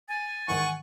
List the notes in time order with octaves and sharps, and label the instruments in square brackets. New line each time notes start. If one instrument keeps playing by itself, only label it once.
[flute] G#5 [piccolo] A6
[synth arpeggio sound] G#2 D#3 E3 [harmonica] F#5 C#6